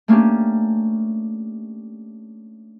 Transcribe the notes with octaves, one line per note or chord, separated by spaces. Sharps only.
A3 A#3 C#4 D4 G4